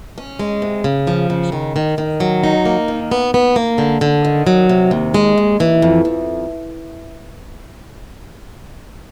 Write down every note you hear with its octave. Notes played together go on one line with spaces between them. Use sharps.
C#4
G#3
C3
C#3
F3
C#3
D#3
D#3
D#3
F#3
D#4
A#3
D#3
B3
B3
A#3
D3
D3
D#3
F#3
C3
D#2
G#3
D#2
E3
F2
F2